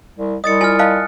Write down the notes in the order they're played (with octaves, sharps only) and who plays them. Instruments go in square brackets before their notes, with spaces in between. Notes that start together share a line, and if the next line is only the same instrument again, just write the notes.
[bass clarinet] C2
[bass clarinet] C2 [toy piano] D#5 [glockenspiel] D#6 A6 C#7
[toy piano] E4 F4 [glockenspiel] G#5 F6
[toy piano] D#5 F5 A5 [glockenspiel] F#6